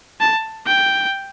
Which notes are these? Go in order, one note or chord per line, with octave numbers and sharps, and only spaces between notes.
A5
G5